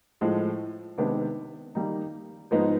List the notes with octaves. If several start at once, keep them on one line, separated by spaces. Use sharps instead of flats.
A2 F3 G#3
C3 D#3 G#3 B3 D4
D#3 G3 A#3 D#4
G#2 F3 G#3 B3 D#4